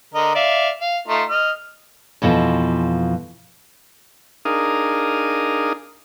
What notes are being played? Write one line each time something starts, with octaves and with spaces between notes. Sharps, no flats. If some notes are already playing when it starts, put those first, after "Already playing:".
D3 A#4 D#5
D5 E5 F5
F5
A3 D#4 F4
D#5 F6
F2 B2 E3 F3
D4 D#4 G#4 A#4 F5 D#6